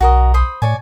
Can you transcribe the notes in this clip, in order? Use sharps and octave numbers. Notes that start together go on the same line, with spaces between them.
B1 F#4 A#4 D#5
C5 B5 D#6
A2 C#5 D5 G#5